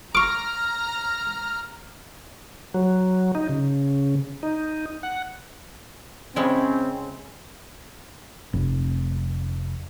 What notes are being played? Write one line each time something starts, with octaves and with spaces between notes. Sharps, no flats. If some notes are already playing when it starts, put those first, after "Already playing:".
A#5 C#6 D6 F6
F#3
D#4
C#3
D#4
F#5
C#3 G#3 C4 C#4 E4
F1